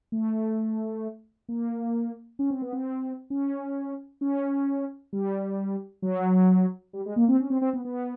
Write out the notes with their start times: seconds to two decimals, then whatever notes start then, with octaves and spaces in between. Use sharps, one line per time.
0.12 A3
1.49 A#3
2.39 C#4
2.50 C4
2.62 B3
2.73 C4
3.30 C#4
4.21 C#4
5.13 G3
6.02 F#3
6.93 G3
7.06 G#3
7.16 A#3
7.28 C4
7.40 C#4
7.50 C4
7.61 C4
7.73 B3
7.85 B3